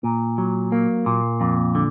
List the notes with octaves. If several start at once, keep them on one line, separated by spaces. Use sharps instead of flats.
A#2
F#3
A#3
A#2
F2
D3